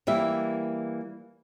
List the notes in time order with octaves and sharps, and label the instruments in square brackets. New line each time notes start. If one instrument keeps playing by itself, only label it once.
[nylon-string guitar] E3 G3 A#3 E5